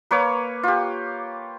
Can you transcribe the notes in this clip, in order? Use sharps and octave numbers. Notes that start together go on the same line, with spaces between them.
A#3 B4 C#5 D6
F4 G4